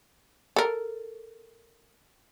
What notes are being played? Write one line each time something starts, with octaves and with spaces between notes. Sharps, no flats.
A4 A#4